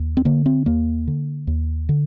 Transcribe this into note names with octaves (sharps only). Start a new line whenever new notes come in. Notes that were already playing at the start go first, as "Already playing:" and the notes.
Already playing: D#2
C4
D3 A#3
C4
D#2 A#3
D3
D#2
D3